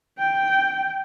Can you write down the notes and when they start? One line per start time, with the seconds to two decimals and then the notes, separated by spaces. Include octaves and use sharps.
0.18 G5